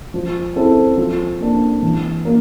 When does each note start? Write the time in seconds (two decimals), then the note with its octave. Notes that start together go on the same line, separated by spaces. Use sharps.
0.14 F3
0.56 C4 E4 A4
0.98 F3
1.40 A#3 D4
1.82 E3
2.25 A#3